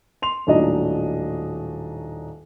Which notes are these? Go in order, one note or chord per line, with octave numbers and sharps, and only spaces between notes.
C6 F7
D#1 A2 F#3 D4 D#4 D#5